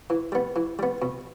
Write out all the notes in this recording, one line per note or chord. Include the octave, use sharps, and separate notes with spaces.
E3
G3 B3
E3
G3 B3
B2